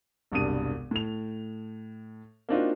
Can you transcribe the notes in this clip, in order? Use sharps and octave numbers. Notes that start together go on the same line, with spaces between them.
E1 C2 G2 D#6 D#7
A2 F7
A#3 C4 D4 D#4 F4 F#4